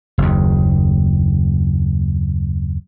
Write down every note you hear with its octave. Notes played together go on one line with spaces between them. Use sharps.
F#1 D#2